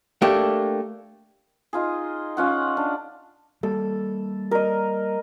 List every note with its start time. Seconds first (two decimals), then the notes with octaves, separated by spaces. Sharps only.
0.22 A3 A#3 D4 G4
1.73 D#4 F4 G#4
2.37 C#4 F4 F#5
2.77 D4
3.63 G3 A#3 A4
4.51 A#4 D#5